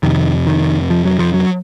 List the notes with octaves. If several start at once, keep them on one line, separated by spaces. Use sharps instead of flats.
F2 C3 D#3
D#3
F3
F#3
F3
F#3